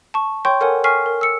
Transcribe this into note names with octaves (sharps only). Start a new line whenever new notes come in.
A5 C#6
C#5 G5 C6 C#6 G6
A4 A#4 C#5 F#5 G#5
G#5 C#6 F6 B6 C7
A#4
E6 C#7